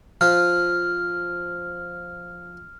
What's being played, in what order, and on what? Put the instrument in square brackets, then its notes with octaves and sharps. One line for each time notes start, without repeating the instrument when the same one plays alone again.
[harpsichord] F3 F4 [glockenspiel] F6